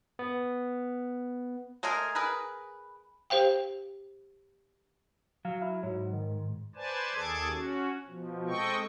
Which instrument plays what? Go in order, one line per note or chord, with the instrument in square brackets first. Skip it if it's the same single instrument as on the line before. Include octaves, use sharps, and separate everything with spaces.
[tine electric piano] B3
[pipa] G#3 A3 G#4 A#4
G#4 A#4 B4
[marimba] G4 C5 F5 G5
[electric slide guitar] F#3 [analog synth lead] F5
[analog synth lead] E4
[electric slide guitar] G#2 [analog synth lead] F#3
[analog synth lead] D#3
[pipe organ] B4 C5 D5 G#5 A5
D#2 G#4 A4 A5 D6 G#6
C#4 F#4
B2 F3
G#3 C4 A4 D#5 G5 C#6